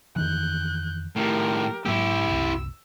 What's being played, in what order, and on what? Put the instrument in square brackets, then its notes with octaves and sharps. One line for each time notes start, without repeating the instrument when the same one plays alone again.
[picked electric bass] F2 D#3 E3 [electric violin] F#6 G6
[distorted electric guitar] A2 D#3 [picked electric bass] A3 [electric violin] G4 A#4
[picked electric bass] G#2 F#3 A#3 [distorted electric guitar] E4 G4 [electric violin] E6
[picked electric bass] F#1 C2